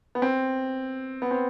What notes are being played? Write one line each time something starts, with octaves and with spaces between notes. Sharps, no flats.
B3
C4
B3
C4